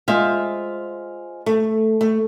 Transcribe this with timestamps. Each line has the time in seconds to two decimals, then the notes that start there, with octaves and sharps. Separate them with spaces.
0.08 G#3 F4 C5 E5 F5
1.46 A3
2.01 A3